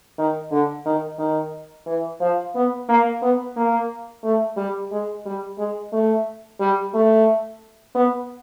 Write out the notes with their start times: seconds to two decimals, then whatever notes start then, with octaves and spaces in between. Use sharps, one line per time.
0.18 D#3
0.51 D3
0.86 D#3
1.19 D#3
1.86 E3
2.21 F3
2.55 B3
2.89 A#3
3.22 B3
3.57 A#3
4.24 A3
4.57 G3
4.92 G#3
5.26 G3
5.58 G#3
5.93 A3
6.60 G3
6.94 A3
7.95 B3